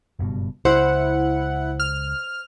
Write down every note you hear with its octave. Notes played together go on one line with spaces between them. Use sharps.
F#1 G2 B2
C#2 E4 C5 F#5
F6